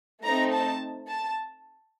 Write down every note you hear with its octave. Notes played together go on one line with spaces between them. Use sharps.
A3 C4 D#4 A#5
A5
A5